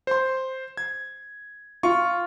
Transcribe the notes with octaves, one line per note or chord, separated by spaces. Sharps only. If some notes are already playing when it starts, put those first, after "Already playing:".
C5 C6
G#6
F4 C#6